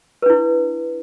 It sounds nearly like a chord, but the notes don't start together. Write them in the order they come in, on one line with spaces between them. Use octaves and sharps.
B4 D4 E4